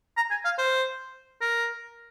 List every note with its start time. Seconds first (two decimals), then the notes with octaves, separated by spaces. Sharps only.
0.17 A#5
0.31 G#5
0.45 F5
0.58 C5
1.41 A#4